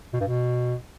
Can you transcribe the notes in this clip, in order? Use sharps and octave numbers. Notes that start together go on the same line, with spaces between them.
B2
G2
B2